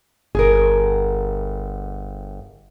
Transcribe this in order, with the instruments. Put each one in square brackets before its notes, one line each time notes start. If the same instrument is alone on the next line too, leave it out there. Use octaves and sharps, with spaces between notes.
[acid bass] G1 [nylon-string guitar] G#4 A#4